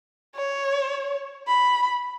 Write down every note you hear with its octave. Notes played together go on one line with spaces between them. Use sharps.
C#5
B5